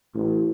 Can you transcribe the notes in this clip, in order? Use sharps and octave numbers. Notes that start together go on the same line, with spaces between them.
A1